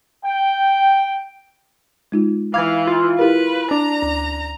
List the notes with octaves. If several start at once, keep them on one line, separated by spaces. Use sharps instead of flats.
G5
G#3 D#4 F4
E3 F5 D6 G#6
F4
E4 G4 A#4 B4
D4 A#5
D2